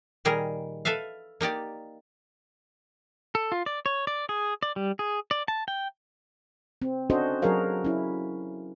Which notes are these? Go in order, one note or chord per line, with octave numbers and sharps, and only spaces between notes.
A#2 D#3 G3 G#4 A#4
A4 B4 E5 F5
A#3 D#4 G4 D5
A4
F4
D5
C#5
D5
G#4
D5
G3
G#4
D5
A5
G5
C4
C#4 D4 F#4 A4 C5 D#5
F#3 F#4 G#4 A#4 C#5 F5
C#4 E4